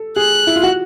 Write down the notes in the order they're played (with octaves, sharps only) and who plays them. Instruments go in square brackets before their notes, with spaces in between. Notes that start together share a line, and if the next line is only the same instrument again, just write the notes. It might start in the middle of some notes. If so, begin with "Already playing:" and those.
Already playing: [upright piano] A4
[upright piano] G#4 [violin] F#6
[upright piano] E4
F4
F#4